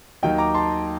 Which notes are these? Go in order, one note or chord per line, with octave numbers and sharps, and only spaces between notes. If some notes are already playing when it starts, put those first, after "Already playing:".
D#2 D#3 F#3 D#5 G5
A#5 D6
A5 C6